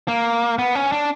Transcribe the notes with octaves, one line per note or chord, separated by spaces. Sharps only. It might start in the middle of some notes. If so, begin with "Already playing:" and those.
A#3
B3
C#4
D4